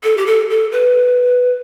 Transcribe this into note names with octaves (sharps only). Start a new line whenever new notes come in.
A4
G4
A4
A4
B4